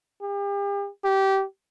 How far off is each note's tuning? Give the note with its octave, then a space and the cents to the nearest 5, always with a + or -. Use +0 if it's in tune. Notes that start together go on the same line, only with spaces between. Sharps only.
G4 +40
G4 -20